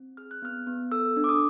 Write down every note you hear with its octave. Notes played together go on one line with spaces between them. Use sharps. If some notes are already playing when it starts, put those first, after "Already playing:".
Already playing: C4
G#4 F6
F#6
B3 F6
B3
A4 E6
D4
D6
D#6